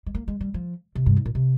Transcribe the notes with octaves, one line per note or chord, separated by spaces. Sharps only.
G#3
A#3
G#3
G3
F3
C3
G2
G#2
A#2
C3